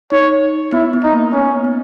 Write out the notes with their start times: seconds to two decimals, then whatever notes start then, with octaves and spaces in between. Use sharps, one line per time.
0.12 D#4 C#5
0.72 B3 E4
0.93 B3
1.04 D#4
1.13 A#3
1.33 B3 C#4
1.64 B3